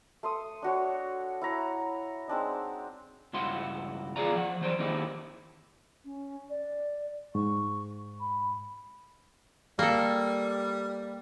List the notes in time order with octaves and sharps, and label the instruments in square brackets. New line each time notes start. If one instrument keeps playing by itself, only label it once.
[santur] A3 C6 D#6
D4 F#4 C#5
E4 C#5 A#5
G#3 C4 D4 D#4
[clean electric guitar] C#2 G2 E4 F#4 C6
E2 A#2 F4 G#4 D5 A#5
F3 F#5
E3 F#3 C5 D5
D#3 A#3 C4 D#4 E4 G4
[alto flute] C#4
D5
[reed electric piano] G#2 [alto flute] C#6
[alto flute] B5
[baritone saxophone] G3 [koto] A#3 A4